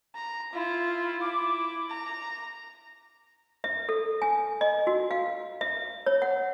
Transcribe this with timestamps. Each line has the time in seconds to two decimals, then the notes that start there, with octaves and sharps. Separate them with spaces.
0.15 A#5
0.53 E4 F4
1.21 E4 D6
1.89 A#5
3.64 E5
3.89 A4
4.22 G#5
4.61 D#5
4.87 F#4
5.11 F5
5.61 E5
6.06 C#5
6.22 F#5